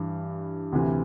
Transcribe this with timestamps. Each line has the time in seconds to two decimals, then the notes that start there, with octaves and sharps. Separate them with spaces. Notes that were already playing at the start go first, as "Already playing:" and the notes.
Already playing: G2 E3
0.72 D2 C3 E3